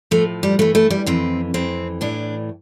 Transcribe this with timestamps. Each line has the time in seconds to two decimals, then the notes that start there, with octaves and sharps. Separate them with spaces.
0.11 A2 F3 A3
0.43 G3
0.59 G2 E3 A3
0.75 A3
0.90 G3
1.06 F2 E3 C4
1.54 F2 E3 C4
2.01 A2 E3 D4